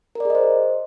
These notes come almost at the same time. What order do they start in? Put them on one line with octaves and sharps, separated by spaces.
A#4 D5 G#4 D#5 C5